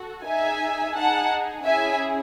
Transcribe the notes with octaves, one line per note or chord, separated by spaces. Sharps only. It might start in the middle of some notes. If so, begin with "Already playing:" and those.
Already playing: F#4 A4
D#4 G#4 E5 G#5
D#4 G#4 F#5 A5
C#4 E4 G#4 E5 G#5